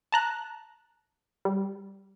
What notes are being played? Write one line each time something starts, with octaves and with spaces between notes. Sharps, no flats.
A5 A#5 F#6
G3